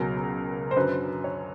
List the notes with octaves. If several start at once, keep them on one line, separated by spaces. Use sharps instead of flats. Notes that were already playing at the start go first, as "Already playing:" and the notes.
Already playing: C#2 B2 F#3 A#4
C5
F#2 D3 F#3 B4
C#5